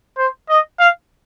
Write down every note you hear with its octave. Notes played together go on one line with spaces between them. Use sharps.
C5
D#5
F5